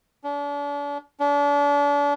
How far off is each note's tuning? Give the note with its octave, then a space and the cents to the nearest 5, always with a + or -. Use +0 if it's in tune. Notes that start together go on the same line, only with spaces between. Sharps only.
D4 -40
D4 -35